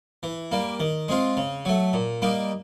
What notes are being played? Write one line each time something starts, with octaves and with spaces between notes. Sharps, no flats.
E3
G3 A#3
D#3
G#3 C4 F4
C#3
F#3 A3
A#2
G3 A#3 D#4